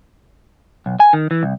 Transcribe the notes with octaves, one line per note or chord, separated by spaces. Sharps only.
B1
G#5
D#3
E3
C2